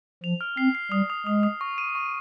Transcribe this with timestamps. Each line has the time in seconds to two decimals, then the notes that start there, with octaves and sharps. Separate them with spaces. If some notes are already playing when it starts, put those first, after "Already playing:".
0.23 F3 F7
0.41 F6
0.57 C4 C7
0.75 C7
0.92 G3 D#6
1.10 D#6
1.26 G#3 D#6
1.43 D#6
1.61 C#6
1.78 D#7
1.95 C#6